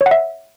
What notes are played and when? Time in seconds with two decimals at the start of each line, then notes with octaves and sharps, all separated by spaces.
0.01 C#5
0.06 F#5
0.11 E5